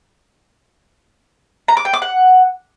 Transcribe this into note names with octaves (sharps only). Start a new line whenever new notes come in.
A#5
D6
G5
D6
F#5